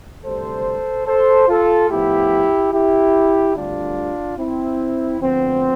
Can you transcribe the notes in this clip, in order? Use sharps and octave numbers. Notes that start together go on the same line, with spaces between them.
D2 C3 G3 A4 C5
A4 C5
F4 A4
A2 F3 B3 E4 G4
E4 G4
D2 D3 G3 C4 D4 F4
C4 E4
D2 D3 F3 B3 C4